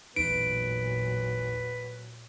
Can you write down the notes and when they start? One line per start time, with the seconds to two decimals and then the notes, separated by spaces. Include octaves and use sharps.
0.16 A1 E2 A#2 F#3 D#4 B4 D7